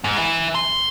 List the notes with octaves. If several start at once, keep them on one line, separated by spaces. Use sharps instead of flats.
G#2
E3
C6